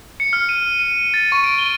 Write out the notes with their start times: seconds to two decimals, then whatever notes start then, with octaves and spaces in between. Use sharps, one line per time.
0.20 C#7
0.33 F6
0.49 D#7
0.79 D#7
1.14 A6
1.32 C#6
1.44 D7
1.58 G7